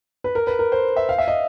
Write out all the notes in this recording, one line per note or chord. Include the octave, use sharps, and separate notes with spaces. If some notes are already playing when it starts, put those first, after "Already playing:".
B4
A#4
B4
A#4
C5
E5
F5
E5
D#5